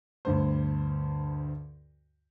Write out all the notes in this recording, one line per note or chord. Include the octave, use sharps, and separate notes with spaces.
D2 G2 C5